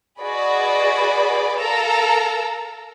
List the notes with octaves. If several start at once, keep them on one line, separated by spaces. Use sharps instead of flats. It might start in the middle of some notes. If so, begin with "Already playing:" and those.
F#4 G#4 B4 D5 D#5 B5
A4 A#4 F5 A#5 E6